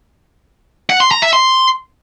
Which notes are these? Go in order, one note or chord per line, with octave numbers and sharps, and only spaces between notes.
F#5
C6
A#5
E5
C6